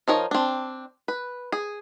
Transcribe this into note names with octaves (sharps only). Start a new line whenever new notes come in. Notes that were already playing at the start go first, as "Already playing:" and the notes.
F3 D#4 A#4 C#5
C4 D4
B4
G#4